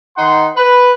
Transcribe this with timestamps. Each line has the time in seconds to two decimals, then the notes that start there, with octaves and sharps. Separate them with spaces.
0.17 D#3 D#4 F#5 C6
0.57 B4